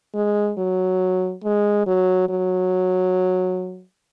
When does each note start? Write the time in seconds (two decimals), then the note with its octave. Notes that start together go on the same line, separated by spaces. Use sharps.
0.15 G#3
0.58 F#3
1.44 G#3
1.87 F#3
2.29 F#3